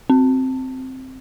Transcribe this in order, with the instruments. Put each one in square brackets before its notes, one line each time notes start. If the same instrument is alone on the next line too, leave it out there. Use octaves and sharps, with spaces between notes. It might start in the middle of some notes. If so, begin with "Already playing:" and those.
[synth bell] C4